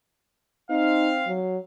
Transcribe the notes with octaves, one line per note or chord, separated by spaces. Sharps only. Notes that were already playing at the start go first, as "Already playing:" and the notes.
C4 D#4 F5
F#3